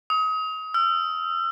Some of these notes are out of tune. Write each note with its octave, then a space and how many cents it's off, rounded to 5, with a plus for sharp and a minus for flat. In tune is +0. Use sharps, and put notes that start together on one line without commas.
D#6 +30
E6 +45